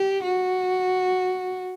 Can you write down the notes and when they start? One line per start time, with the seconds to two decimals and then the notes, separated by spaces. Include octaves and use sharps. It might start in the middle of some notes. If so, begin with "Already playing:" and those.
Already playing: G4
0.23 F#4